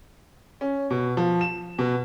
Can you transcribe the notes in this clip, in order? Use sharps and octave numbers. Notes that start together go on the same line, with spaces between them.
C#4
B2
F3
E7
B2